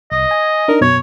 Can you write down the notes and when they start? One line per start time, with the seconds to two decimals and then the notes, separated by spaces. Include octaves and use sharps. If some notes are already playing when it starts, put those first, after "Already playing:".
0.12 C2 D#5
0.31 G#5
0.68 D4 D#4 A#4
0.81 F#2 B2 C#5